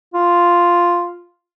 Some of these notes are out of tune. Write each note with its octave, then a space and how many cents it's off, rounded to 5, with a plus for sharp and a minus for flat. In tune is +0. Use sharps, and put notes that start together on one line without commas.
F4 +0